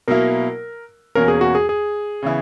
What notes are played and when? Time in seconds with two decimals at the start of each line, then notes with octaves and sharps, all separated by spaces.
0.08 B2 F#3 A#3 E4 A#4
1.15 E2 B2 A#3 C#4 A#4
1.28 G#4
1.41 F#4
1.55 G#4
1.69 G#4
2.23 C#3 E3 B3 E4